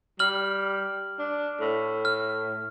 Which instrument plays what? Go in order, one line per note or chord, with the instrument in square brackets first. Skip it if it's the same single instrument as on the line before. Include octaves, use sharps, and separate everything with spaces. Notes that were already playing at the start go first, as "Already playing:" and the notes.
[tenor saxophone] G3 [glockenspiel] F6 F#7
[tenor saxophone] D4
A2
[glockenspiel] F6